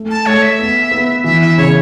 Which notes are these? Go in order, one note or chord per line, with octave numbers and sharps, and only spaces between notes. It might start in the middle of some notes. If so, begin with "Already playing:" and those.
Already playing: A3
A5
A3 C#5
E5
B3
B3
E3 E5
E5
C#3 C#5